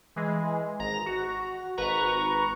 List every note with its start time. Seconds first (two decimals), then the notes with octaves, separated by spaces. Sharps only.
0.16 E3 G#3
0.79 G#1 A#5 A#6
1.06 F#4
1.77 G#1 B4 A#5 C#6